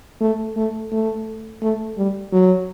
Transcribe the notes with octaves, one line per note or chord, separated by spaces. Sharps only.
A3
A3
A3
A3
G3
F#3